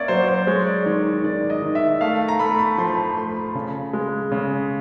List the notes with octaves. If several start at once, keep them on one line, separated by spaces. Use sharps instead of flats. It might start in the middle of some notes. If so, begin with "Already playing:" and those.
Already playing: A#3 C#4 C#5 D5 E5
F#3 C5
C5
G#3 C#5
D5
D#3 C#5
D#3 D5
D#5
D#3
E5
A3 F5
A#5
A3 B5
B5
F3 C6
B5
A3 C6
B5
C#3
G#3
C#3